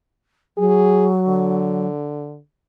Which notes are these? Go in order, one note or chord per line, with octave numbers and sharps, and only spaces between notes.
F#3 G#4
D3